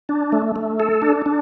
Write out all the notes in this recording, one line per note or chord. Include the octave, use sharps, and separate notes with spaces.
D4
A3
A3
A4
D4
D4